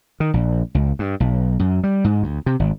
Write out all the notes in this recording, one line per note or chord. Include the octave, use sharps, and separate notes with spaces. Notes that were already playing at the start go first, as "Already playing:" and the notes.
D#3
A#1
C#2
G2
B1
F#2
G3
G#2
D2
C3
G#1